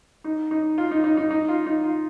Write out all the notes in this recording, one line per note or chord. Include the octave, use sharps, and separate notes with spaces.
D#4
D#4
F4
D#4
D#4
D#4
D#4
F4
D#4
F4